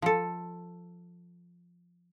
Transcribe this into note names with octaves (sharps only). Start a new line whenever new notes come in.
F3 A4